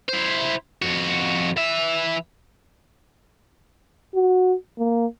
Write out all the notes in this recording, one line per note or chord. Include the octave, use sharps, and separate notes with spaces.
E4 C5
F2 F#4
E3 E5
F#4
A#3